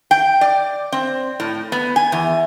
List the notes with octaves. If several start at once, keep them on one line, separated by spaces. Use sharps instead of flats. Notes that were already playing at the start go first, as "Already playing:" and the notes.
G5
D5
C4
A2
B3
G#5
E2